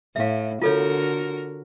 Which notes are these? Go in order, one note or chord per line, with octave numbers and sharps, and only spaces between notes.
A2 E5 F5
D3 F4 F#4 A4 A#4 C#5